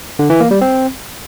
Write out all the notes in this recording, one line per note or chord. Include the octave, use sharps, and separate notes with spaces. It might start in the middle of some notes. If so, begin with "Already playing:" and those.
D3
E3
A#3
G3
C4